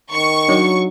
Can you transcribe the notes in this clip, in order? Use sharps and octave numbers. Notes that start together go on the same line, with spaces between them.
D#3 C#6
F#3 D4 D#4 C#5